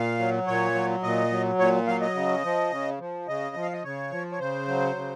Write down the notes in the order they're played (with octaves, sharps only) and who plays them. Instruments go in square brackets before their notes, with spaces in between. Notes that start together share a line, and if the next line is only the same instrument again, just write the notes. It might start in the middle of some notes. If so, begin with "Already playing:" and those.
Already playing: [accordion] A#2 F5
F#3
A#2 C#5
F#3
A#2 D#5
F#3
A#2 C#5
F#3 F5
D#5
C#3
F3
C#3
F3
C#3 D#5
F3
F5
D#5
C#3 C#5
F3
C#5
C#3 C5
F#3
C#3